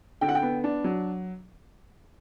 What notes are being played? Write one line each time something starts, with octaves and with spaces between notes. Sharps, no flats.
D3 G5
F#5
G5
B3
D4
F#3